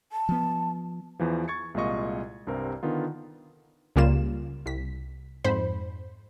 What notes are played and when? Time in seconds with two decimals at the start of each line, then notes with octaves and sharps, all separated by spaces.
0.12 A5
0.29 F3 B3
1.19 E2 E3 F3
1.48 C#6 G#6 A6 C#7
1.74 C2 A#2 G#3 F4 D#5 C#6
2.47 C2 G2 C4 A#4
2.83 D3 D#3 B3 F4
3.96 C#2 C#3 G3 A#3 F4 E7
4.66 C2 B6
5.44 F2 G#2 C5 B5